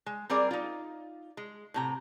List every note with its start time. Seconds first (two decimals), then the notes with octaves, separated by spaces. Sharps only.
0.06 G#3
0.30 G3 C4 G#4 A#4 D5
0.51 D#4 F4
1.37 G#3
1.74 A2 C3 A#5